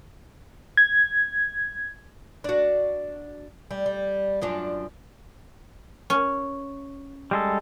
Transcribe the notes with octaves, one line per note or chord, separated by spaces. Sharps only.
G#6
D4 F#4
G3
G3
F#2 F3 D4
C#4
G3 G#3 A4